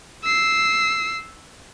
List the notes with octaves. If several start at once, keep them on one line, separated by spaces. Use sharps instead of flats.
E6 C7